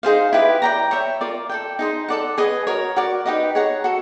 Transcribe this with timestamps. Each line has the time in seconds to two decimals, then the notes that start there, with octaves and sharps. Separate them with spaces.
0.03 D#4 G#4 C5 F5
0.33 E4 G4 B4
0.62 D5 G5 A#5
0.91 C#5 E5 G5
1.21 F4 A#4 D5
1.49 A4 D5 G5
1.79 D#4 G#4 C5
2.08 A4 D5 F#5
2.38 G#4 B4 D#5 G#5
2.67 F#4 A#4 C#5
2.96 F#4 A#4 D5
3.26 D#4 G4 B4 D#5
3.55 G#4 C#5 F#5 A#5
3.84 F#4 A4